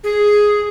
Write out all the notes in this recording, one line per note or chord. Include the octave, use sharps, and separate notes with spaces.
G#4